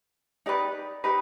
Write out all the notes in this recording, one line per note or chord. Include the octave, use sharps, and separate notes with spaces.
D#4 G4 B4 D5
D#4 G4 B4